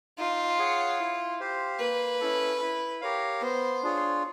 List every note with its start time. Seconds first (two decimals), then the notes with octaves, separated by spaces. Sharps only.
0.18 D#4 F4
0.59 G#4 C#5 F#5
0.99 E4
1.40 G4 C5 F5
1.79 A#3 B4
2.20 C#4 E4 A4
2.60 E4
3.01 G4 A#4 C#5 F5
3.41 B3 C5
3.83 D4 F4 G#4 C#5